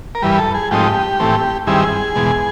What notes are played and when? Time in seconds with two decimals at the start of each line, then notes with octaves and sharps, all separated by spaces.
0.15 A#4
0.22 G2 E3 G3 B4
0.38 A4
0.54 G#4
0.71 G#2 F3 A3 C4 D#4 G4
1.20 A2 E3 A3 C4
1.67 G2 D#3 G3 C4 E4 G#4
2.15 E2 B2 G#3